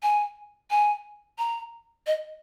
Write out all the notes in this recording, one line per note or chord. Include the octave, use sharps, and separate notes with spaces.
G#5
G#5
A#5
D#5